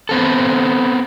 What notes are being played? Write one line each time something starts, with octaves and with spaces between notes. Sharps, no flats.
B3 C4 A4